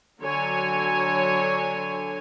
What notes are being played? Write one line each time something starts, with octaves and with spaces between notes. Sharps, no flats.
D3 F#3 C#5 G#5